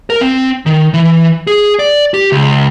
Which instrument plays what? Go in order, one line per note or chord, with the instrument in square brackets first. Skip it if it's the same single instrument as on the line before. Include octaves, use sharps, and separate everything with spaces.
[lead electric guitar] A#4
C4
D#3
E3
G#4
D5
G4
C#2